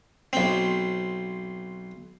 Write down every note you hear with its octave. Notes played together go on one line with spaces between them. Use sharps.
B1 C4